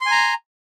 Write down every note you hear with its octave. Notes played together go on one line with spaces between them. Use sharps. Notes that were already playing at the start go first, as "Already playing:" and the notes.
G#5 A#5 C6